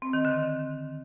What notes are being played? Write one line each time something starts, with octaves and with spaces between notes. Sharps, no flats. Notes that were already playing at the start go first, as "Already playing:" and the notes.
C4
D#3
D3